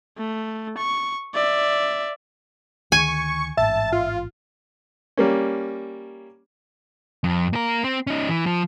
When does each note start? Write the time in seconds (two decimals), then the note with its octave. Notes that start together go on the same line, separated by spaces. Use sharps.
0.18 A3
0.77 C#6
1.34 D5 E5
2.92 D2 D#3 G#5 C#6
3.57 A1 G#2 E5 A5
3.93 F4
5.17 G3 A#3 C#4
7.24 F2
7.53 A#3 A#4
7.84 C4
8.07 C#4 D#4
8.29 E3
8.46 F3